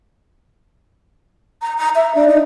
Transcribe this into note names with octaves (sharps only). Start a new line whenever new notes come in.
A#5
A#5
E5
D4
D#4